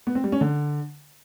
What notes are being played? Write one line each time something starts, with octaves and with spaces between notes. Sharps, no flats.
B3
C4
G3
C#4
D3